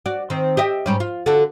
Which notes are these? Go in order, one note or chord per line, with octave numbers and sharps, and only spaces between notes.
F#4 D5
D#3 C4
G4 D#5 E5
G#2 G3 C#4
F4
D3 F#4 A4